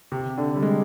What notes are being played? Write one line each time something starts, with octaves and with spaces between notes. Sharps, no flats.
C3
D3
G3
G#3